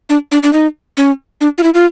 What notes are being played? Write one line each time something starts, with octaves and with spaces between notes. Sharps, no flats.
D4
D4
D4
D#4
C#4
D4
F4
E4
F4